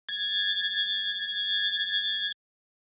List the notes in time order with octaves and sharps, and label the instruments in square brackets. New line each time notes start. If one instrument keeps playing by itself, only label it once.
[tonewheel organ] G#6 A6